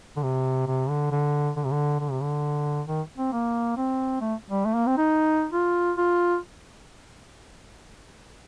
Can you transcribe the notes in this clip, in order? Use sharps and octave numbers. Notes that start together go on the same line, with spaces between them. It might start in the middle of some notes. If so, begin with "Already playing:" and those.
D3
C3
C3
D3
D3
D3
C3
D3
D3
C3
D3
D#3
C4
A#3
C4
A3
G3
A3
A#3
C4
D#4
F4
F4